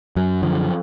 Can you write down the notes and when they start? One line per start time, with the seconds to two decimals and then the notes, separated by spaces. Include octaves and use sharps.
0.16 F#2 F#3
0.43 D3 F3